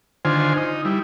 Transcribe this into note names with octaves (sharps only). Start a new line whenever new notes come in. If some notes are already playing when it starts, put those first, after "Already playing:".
D3 D#3 F4 C5 G#5
D#4
G3 E4